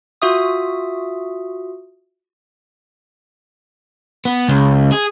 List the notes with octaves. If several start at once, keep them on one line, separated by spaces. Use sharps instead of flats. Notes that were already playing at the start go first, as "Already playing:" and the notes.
F4 F#4 E5 D#6
B3
C#2
G#4